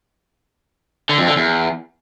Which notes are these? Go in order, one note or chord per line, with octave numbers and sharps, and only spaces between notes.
D3
F2
D3
E2